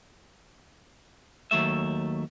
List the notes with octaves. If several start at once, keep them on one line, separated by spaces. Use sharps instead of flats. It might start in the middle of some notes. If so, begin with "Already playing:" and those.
D#2 F#3 A3 E5